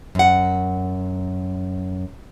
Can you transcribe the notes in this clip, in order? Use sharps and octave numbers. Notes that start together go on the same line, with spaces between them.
F#2 F#5